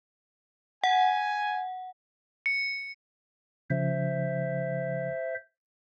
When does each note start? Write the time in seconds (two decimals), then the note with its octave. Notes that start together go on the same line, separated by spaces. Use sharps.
0.84 F#5 G#5
2.46 C#7
3.70 C#3 F3 C5 E5